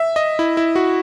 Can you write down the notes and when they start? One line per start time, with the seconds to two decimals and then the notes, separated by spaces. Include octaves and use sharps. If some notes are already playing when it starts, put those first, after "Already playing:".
Already playing: E5
0.16 D#5
0.39 E4
0.57 E4
0.76 F#4